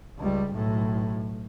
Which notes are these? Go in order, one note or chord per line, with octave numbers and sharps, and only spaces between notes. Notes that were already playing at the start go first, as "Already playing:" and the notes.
C#2 G3
B1 A2